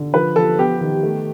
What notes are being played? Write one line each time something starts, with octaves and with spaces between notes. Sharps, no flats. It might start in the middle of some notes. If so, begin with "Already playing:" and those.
Already playing: D3
F3 B4
F3 A4
B3 G4
D#3
A3